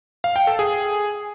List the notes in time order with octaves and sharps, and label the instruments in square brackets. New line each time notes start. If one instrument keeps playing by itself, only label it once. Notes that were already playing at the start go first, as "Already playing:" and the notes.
[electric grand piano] F5
G5
A4
G#4